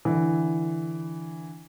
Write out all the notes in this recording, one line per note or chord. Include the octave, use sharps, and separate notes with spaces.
D3 E3